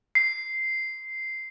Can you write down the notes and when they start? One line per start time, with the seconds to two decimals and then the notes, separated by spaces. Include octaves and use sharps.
0.15 C7